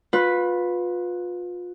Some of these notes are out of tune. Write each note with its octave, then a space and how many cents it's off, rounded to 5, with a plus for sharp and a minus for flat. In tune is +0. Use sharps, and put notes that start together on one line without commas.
F4 +30 B4 +0